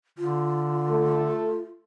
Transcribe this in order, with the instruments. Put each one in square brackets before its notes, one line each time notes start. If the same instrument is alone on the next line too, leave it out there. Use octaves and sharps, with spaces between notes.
[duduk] D3 [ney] F4
[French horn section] A3 A4